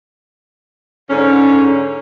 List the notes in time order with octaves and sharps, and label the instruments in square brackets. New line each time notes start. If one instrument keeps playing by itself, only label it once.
[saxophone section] G#2 D3 C#4